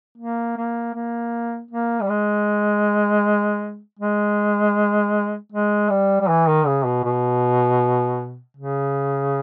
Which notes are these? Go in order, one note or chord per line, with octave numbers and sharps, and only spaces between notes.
A#3
A#3
A#3
A#3
G3
G#3
G#3
G#3
G3
G3
E3
D#3
C#3
B2
B2
C#3